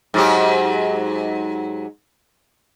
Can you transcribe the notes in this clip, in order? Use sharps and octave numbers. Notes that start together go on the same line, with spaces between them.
G#2 F#3 G4